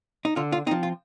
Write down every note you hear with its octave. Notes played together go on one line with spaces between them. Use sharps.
D#4
D3 F4
F4
F3 C4 D#4
F4